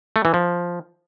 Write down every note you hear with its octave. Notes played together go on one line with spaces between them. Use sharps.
A3
E3
F3